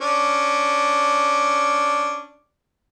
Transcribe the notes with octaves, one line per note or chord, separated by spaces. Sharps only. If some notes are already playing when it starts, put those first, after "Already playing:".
C#4 D4